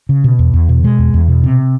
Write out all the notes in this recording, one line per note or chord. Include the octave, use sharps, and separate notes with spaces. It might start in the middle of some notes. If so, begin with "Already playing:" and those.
C#3
B2
E2
E2
B2
B2 G#3
E2
E2
B2
C3